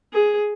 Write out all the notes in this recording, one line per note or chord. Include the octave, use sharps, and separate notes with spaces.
G#4